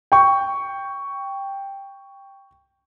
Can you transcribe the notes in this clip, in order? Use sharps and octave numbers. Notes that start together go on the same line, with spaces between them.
G5 C#6